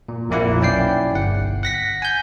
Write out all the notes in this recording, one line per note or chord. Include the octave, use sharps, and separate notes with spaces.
A#2
A#1 F2 A#2 A#3 E4 F#5
B1 C#4 E4 D5 G5 C7
G1 F#5
F#5 A#6 B6
G#5 G6